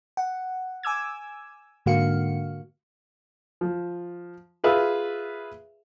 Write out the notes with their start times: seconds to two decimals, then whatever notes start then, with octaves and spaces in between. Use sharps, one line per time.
0.17 F#5
0.83 G#5 D6 E6 G#6
1.86 G#2 D3 A#3 F#4 F5 C#7
3.61 F3
4.64 F4 G#4 B4 E5 F5